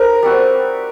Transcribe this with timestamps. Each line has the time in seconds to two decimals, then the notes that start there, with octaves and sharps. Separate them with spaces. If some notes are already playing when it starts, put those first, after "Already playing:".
Already playing: D#4 G4 A#4 C5
0.23 G3 C4 F#4